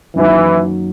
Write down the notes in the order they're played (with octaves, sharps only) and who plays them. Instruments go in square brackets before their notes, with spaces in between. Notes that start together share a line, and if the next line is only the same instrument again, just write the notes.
[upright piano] F#2 D#3 F#3 A#3 [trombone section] E3